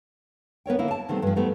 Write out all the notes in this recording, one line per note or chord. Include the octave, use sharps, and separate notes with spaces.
B3 A#4 C#5 G5
D3 A#3 E4
A5
C3 D#3 G3 A3 B3 C4
G2 F3
G#2 G3 A3 B3